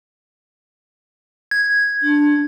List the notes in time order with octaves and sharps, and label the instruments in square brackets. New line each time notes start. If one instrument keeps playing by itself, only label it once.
[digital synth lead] G#6
[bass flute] D4